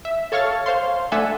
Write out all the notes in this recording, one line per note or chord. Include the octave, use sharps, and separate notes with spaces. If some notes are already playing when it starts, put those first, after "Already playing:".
E5
A4 C#5 F5 C#6 F6 A6
C5 F5 C6
A3 D4 A4 E5 F#5 G#5